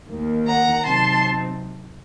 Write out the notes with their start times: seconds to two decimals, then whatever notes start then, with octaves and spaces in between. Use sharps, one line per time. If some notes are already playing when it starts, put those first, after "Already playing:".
0.10 D#2 D#3 A#3
0.47 F#5 A#5
0.84 C3 F#3 C4 D#4 A5 C6